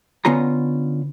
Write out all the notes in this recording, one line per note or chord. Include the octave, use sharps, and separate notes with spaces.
D3 B3 C#4 F4 A#5